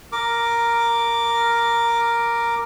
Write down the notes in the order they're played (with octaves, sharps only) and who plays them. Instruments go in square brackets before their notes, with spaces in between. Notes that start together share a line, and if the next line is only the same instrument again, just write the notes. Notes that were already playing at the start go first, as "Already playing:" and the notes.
[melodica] A#4 D6